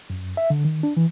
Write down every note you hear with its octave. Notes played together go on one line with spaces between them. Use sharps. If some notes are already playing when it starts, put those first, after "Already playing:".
F#2
E5
D3
D#3
D4
E3